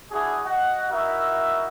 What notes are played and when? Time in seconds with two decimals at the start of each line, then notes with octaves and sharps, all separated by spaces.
0.11 D4 E4 F#4 G#4
0.45 F#4 D#5 F#5
0.90 D#4 E4 F#4 A#4 E5